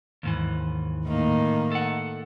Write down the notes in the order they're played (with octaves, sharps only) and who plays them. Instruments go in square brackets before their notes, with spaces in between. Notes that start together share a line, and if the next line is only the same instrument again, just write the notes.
[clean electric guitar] D#2 G#2 E3
[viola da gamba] A2 D#3 A#3
[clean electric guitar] A4 F#5